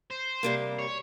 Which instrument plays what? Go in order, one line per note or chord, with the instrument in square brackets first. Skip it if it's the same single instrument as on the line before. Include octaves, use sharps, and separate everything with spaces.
[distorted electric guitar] C5
[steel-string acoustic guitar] C3 G3 A#3
[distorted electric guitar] C#5